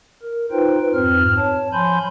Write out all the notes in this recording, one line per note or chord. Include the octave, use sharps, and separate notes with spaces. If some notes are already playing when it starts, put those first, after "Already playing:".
A#4
D#4 F4 B4 C5 G5
F2 G#2 C4 F6
C#5 A5
F3 G#5 B5 C6 G6